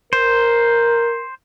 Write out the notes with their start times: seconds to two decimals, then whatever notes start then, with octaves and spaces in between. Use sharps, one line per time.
0.13 A#4 C5